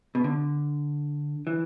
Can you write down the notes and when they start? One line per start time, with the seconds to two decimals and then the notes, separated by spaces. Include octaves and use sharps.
0.15 B2
0.24 D3
1.47 E3